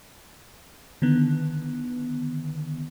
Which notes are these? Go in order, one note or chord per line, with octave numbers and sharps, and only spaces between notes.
D3 D#3 B3